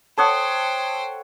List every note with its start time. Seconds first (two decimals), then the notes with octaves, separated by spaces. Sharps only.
0.18 A4 C5 C#5 F#5 G5 A5 D#6